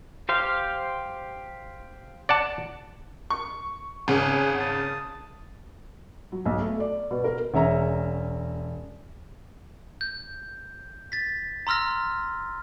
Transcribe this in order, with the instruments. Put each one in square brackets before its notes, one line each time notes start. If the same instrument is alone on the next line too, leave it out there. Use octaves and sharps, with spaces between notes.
[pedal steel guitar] G4 C5 F5
[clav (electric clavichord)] D5 F#5 A5
[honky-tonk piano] C#6
[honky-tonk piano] G#1 C#3 [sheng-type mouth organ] F#5 G#5
[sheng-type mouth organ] A5 D#6
[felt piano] F#3
B1
A3
D5
B2
A#4
[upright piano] E1 C#4 E5 A#5
[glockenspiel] G6
A6 B6
A#5 C6 E6 F6 A#6